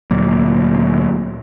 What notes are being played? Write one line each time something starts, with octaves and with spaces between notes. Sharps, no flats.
D2 A#2 F#3 A#3